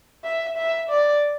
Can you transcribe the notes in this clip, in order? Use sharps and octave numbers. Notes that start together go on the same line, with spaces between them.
E5
E5
D5